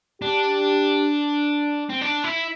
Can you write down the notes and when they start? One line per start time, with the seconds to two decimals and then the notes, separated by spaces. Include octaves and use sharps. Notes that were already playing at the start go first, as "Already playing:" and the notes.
0.22 D4 G4
1.89 C4
2.01 D4
2.24 E4